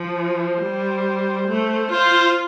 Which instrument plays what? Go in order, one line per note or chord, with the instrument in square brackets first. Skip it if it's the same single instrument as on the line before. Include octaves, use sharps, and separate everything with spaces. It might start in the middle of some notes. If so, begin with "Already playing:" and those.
Already playing: [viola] F3
[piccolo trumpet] C5
[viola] G3
A3
[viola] F4 [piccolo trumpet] C5